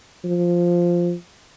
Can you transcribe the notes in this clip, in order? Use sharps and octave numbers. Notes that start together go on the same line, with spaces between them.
F3